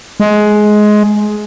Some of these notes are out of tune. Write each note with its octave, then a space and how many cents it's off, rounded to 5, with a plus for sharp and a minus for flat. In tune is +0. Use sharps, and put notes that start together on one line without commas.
G#3 +15